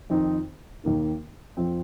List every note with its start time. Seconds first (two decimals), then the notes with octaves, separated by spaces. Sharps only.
0.10 F2 D#3 C4 D#4
0.84 D#2 D#3 A#3 D#4
1.57 F2 F3 C4